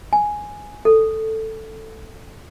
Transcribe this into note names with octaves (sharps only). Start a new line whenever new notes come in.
G#5
A4